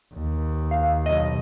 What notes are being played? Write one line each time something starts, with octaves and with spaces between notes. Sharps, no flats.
D#2
F5
B1 D#5